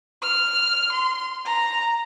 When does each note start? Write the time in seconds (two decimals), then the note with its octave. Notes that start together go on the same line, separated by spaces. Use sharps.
0.22 F6
0.92 C6
1.45 A#5